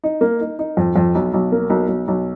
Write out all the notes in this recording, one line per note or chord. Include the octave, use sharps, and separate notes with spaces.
D#4
A#3
D#4
D#4
F2
F2
B1
B1
A#3
B1
B1
B1